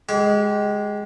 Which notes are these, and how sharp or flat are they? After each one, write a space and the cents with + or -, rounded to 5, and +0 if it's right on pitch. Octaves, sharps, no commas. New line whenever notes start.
G#3 +0 G4 -30